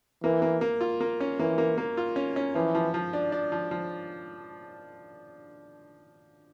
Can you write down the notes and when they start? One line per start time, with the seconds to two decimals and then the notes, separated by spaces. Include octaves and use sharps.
0.23 E3 A#3
0.42 A#3
0.61 A#3
0.81 F4
1.01 A#3
1.20 C#4
1.39 E3 A#3
1.58 A#3
1.78 A#3
1.97 F4
2.16 C#4
2.36 C#4
2.55 E3 F3
2.75 F3
2.94 F3
3.13 D4
3.32 D4
3.52 F3
3.71 F3